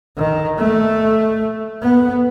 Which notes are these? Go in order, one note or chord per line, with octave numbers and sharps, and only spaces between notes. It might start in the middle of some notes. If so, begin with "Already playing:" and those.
D#3
A3
B3